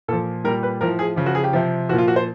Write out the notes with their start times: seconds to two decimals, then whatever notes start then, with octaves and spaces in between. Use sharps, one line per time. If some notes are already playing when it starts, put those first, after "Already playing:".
0.08 A#2 A4
0.12 F3
0.44 G3 A#4
0.48 A#2
0.63 B4
0.81 A2 F3 A#4
0.99 G#4
1.16 C#3 F3
1.26 F#4
1.35 G#4
1.44 G4
1.53 C3 F3
1.89 F3 F#4
1.93 A#2
1.98 F4
2.08 F#4
2.16 C5